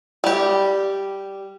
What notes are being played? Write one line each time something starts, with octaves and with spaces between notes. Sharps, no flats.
G3 G4